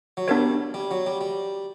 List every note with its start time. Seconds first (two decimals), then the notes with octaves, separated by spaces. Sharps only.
0.17 F#3
0.28 G3 B3 D4 A#4 C#5
0.74 G3
0.91 F#3
1.06 G3
1.21 G3